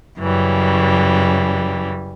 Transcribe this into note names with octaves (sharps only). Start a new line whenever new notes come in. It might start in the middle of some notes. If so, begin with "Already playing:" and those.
F#2 C#3 E3 G3